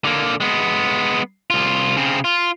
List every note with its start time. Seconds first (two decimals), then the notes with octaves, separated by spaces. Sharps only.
0.04 D3 A#3
0.40 G#3 B3
1.50 C2 F4
1.97 C#3 C4
2.24 F4